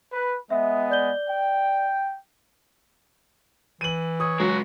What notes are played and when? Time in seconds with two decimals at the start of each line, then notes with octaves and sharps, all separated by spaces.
0.13 B4
0.50 G#3 B3 D#5 E5
0.90 D5 G6 G7
1.28 G5
3.81 E3 D#7 F#7
4.20 C#5 D#6
4.40 C#2 F#3 G#3 F#4